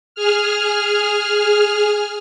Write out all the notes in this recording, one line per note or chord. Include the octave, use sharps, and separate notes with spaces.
G#4 F6